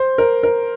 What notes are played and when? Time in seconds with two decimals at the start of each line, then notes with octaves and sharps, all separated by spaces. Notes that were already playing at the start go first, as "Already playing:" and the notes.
Already playing: C5
0.18 A#4
0.43 A#4